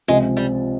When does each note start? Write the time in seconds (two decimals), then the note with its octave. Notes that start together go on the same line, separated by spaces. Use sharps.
0.08 C#2 C3 F3 G#3
0.37 G3